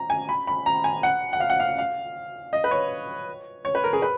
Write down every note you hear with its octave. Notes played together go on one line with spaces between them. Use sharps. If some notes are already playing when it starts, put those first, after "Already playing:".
Already playing: A#5
G#5
B5
B5
A#5
G#5
F#5
F#5
F5
F#5
F5
F5
D#5
B4
C#5
C#5
B4
A#4
G#4
B4